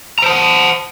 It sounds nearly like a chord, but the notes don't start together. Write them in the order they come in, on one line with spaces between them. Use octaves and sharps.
A#5 C5 A5 F#5